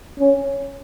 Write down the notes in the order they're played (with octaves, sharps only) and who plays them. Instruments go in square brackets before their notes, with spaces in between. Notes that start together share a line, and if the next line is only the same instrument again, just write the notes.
[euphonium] C#4